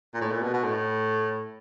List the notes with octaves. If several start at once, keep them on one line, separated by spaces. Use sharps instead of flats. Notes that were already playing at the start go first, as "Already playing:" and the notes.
A#2
A2
A#2
B2
B2
A2